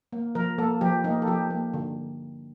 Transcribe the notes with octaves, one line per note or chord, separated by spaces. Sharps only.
A#3
F3 A#4
A#3 A4
F3 G4
A#3 D#4
A4
F3 G4
A#3
D3